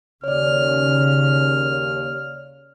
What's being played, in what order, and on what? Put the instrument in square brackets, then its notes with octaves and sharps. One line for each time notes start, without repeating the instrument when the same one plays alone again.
[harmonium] D#2 [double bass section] C#3 [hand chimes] C#5 D5 [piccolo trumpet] F6